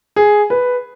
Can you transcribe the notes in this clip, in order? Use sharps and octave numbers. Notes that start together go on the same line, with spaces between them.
G#4
B4